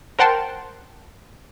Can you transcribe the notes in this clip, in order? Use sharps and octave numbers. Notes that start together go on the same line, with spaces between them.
A#4 C5 F#5 G5 A5 C6